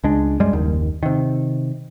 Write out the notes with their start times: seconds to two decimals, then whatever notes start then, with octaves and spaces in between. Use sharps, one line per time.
0.04 C#2 G#3 D4
0.40 F#2 G3 G#3
0.53 F#1 D#2 D#3
1.03 C3 D#3